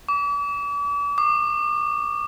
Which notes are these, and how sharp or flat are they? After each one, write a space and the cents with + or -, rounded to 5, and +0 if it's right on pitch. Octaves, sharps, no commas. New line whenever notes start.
D6 -40
D6 +45